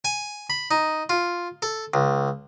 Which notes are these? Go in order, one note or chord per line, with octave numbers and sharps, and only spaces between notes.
G#5
B5
D#4
F4
A4
C#2